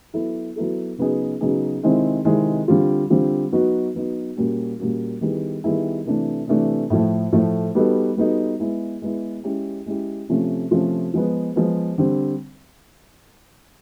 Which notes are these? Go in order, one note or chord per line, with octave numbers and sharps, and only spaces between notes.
F#3 B3 E4 A4
F#3 B3 E4 A4
C#3 F#3 B3 D#4 G#4
C#3 F#3 B3 D#4 G#4
C3 D#3 G#3 C4 E4
C3 D#3 G#3 C4 E4
D3 G3 C4 F4
D3 G3 C4 F4
F#3 B3 D#4 F#4
F#3 B3 D#4 F#4
A#2 G3 A#3 C#4 F#4
A#2 G3 A#3 C#4 F#4
D#3 G3 B3 E4 G#4
D#3 G3 B3 E4 G#4
C3 E3 A3 D4
C3 E3 A3 D4
A2 F3 A3
A2 F3 A3
G3 B3 D#4 F#4 A4
G3 B3 D#4 F#4 A4
G#3 B3 E4
G#3 B3 E4
G#3 C#4 E4 G4
G#3 C#4 E4 G4
C3 F3 A3 C#4 F4
C3 F3 A3 C#4 F4
F3 G#3 B3
F3 G#3 B3
D3 G3 C4